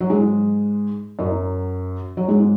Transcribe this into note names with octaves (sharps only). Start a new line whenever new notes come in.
F#3
G#2 G#3
F#2 F#3
F#3
G#2 G#3